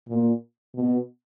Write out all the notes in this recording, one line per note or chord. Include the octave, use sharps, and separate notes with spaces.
A#2
B2